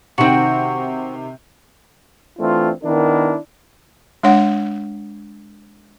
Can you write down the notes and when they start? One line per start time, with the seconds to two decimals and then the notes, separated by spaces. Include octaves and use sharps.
0.18 C3 D#3 C4 F#4
2.40 E3 A3 C4 D4 F4
2.84 D#3 B3 D4 E4 A#4
4.23 G#3 D4 C#5 F#5